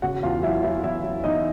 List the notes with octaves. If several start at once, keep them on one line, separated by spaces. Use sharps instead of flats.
C#3 F#4 F#5
E2 F4 F5
F#3 E4 E5
F#3 E4 E5
E2 E4 E5
F#3
E2 D#4 D#5